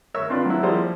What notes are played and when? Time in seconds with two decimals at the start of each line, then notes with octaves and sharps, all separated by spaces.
0.14 A#4 C#5 E5 C#6 E6
0.30 C4 D4 F4 B4
0.46 F#3 E4
0.63 F3 G3 A#3 E4 C5